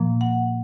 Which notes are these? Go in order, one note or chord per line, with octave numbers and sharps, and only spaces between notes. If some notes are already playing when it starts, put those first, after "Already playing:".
Already playing: A#2 F3 A#3
F#5